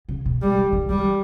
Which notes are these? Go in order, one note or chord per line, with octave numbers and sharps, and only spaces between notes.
C#3
B2
G3
D3
D3
E3 G3